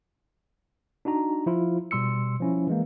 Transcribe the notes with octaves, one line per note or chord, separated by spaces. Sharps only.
D4 D#4 F#4 A#5
F3 E4 F4
B2 G3 C6 E6 C#7
F3 C#4 E4
E3 G#3 A#3